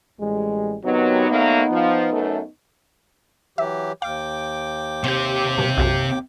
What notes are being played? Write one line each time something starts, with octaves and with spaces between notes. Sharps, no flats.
A1 G3 G#3
C3 D#3 F#3 B3 D#4
F#3 A3 A#3
F3
F#2 A3
E3 F#3 G4 E5
D#2 F5 G5 D6
C3 G4 C6 G6
G2 B2
B1 F#2